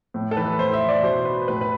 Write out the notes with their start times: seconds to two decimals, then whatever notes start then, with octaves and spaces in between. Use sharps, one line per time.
0.14 A2
0.31 A4
0.37 E3 B4
0.58 A2 C5
0.73 E5
0.82 E3
0.89 D5
1.03 B2 C5
1.25 B4
1.48 A2 B4
1.61 B4